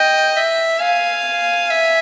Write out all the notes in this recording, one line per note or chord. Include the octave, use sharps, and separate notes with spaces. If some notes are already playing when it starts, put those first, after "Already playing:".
Already playing: D#5 G5
E5
F5 G#5
E5